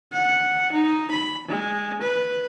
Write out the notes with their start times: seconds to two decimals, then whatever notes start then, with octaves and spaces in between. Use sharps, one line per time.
0.13 F#5
0.72 D#4
1.12 B5
1.48 G#3
2.02 B4